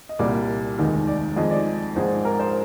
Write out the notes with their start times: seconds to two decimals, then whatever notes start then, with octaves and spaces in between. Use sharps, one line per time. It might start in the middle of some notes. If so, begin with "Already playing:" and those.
0.09 D#5
0.19 C2 A#2 G3 D5
0.78 F1 D#2 D#3 G#3
1.07 D5
1.37 F2 D#3 G#3 D#5
1.51 D5
1.95 A#1 G#2 F3 G#3
2.25 A#4
2.40 C5